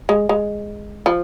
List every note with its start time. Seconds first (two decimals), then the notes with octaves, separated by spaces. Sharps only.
0.09 G#3
0.29 G#3
1.06 F3